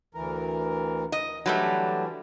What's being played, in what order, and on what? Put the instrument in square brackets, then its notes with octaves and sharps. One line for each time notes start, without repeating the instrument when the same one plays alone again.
[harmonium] D2 E3 A#4
[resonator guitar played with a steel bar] D#5
[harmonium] D3 E3 D4 [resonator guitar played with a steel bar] F#3 G3 A3